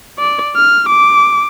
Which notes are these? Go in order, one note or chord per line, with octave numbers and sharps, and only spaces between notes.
D5
F6
D6